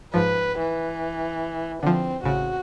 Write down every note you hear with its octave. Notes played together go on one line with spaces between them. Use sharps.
G#2 F3 B4
E3
D3 F3 C4
A1 C#3 F#4